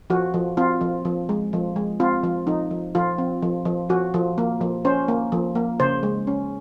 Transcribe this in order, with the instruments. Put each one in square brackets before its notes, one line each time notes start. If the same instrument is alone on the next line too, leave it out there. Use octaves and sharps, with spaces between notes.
[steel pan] F3 F#4
F3
C4 F4
F3
F3
G#3
F3
G#3
C4 F4
F3
F3 D#4
F3
F3 F4
C4
F3
F3
F3 F#4
F3
A#3
F3
C#4 C5
A#3
F3
A#3
C#3 C5
G#3
C#4